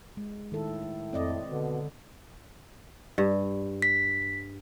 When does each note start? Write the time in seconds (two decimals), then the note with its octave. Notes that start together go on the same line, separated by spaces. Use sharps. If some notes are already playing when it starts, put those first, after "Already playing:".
0.17 G#3
0.52 A2 D#3 A4
1.13 F2 C4 D5 D#5
1.50 B2 D3
3.18 G2
3.82 B6